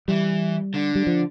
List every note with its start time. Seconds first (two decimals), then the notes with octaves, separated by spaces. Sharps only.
0.08 E3 G3
0.74 D3
0.95 G3
1.07 F3